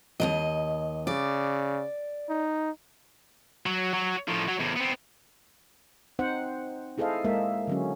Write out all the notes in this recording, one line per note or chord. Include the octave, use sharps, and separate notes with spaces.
D#2 D#3 D#5
C#3 D5
D#4
F#3
F#3
A2 F3
F#3
E2 A2
B3 C4
C4 D#4 C5 F#5
E4 G#4 A4 C5 D#5 F5
G#3 A#3 G#4 A#4 E5
D3 F#3 C#4